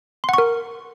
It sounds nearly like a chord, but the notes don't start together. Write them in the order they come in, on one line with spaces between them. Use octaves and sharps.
C6 F#5 C#6 A#4